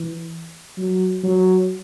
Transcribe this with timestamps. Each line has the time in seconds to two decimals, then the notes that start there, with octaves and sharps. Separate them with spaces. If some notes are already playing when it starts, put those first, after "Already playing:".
Already playing: E3
0.77 F#3
1.23 F#3